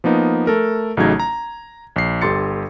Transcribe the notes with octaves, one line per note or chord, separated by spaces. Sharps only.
F3 A#3 B3 D#4
A3 A4 A#4
A1 C#3 F#3 A3 D#4 G#6
A#5
A#1 C7
G1 G4 A4 C6 A6 C#7